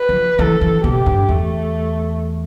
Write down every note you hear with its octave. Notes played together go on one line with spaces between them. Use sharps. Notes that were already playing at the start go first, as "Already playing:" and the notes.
Already playing: B4
F3
E3 A4
E3
B2 G4
G2
E2 A3